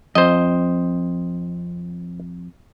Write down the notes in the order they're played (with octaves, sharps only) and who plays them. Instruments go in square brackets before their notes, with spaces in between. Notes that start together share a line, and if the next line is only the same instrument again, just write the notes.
[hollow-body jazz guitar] F2 [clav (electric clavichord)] C5 D#5